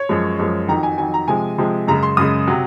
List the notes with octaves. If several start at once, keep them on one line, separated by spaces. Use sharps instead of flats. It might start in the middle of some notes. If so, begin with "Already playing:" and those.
Already playing: C#5
F#2 F3 G#3
F#2 F3 G#3
F2 D#3 F#3 A#5
G#5
F2 D#3 F#3 G#5
A#5
C3 F3 G#3 G#5
C3 F3 G#3
F#2 C#3 G#3 A#5
C6
F#2 C#3 G#3 D#6
C3 F#3